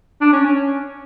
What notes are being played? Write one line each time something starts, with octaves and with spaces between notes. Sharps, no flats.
D4
C#4
C#4